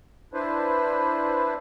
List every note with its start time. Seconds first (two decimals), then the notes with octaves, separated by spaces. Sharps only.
0.33 D4 E4 B4 C5